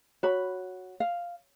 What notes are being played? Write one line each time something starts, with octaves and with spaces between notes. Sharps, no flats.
F#4 C#5 B5
F5